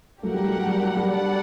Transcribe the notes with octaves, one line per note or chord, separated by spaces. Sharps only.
F#3 A3 A#3 D4 G4 A#4 F#5
G3
F#3 A3
F#3
G3
F#3
G3
D4 A4 D5 F#5